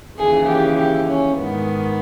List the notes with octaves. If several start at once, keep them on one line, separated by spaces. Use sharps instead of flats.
D#2 C#3 E3 G#4
G4
G4
C#4
G#2 D#3 B3